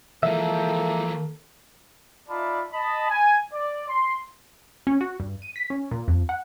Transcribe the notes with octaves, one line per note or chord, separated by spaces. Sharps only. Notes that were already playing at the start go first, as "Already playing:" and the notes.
E3 F3 G#3 A#3 A4 E5
D#4 F4 D5 E5 A5 B5
D#5 A5 B5
G#5
D5
C6
C#4
F#4
G2
D#7
B6
C#4
A#2
F2
F#5